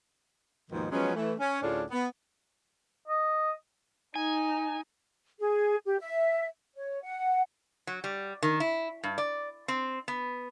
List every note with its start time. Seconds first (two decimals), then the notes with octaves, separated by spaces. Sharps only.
0.70 D#2 G#2 B2 D#3 F3
0.91 F3 F#3 G#3 B3 C#4
1.15 E3 A3
1.38 C#4
1.61 D2 A2 C#4 D4 F4 G#4
1.90 B3
3.08 D#5
4.16 D#4 G#5
5.39 G#4
5.86 G4
6.00 E5
6.76 C#5
7.03 F#5
7.87 F#3
8.04 G3
8.43 D#3
8.60 E4
9.04 G2
9.18 D5
9.68 C4
10.08 B3